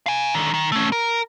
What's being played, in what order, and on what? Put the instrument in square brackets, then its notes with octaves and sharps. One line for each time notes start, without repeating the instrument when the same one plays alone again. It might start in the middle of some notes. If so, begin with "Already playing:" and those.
[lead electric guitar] F5 G#5
D3 D#3
D#3
A3 C#4
A#4